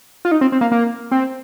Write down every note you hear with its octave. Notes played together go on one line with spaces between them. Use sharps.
F4
D#4
C4
C4
A#3
A#3
C4